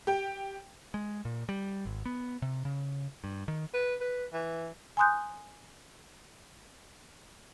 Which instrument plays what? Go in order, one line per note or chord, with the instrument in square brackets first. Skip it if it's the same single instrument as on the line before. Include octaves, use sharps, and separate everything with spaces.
[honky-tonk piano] G4 G5
[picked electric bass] G#3
A#2
G3
G#1
B3
C3
C#3
G2
D#3
[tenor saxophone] B4
B4
E3
[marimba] G#5 A#5 C6 D#6 F#6 G6